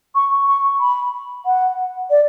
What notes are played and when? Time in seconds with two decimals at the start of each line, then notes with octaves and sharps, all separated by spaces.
0.15 C#6
0.47 C#6
0.80 B5
1.46 F#5
2.10 D5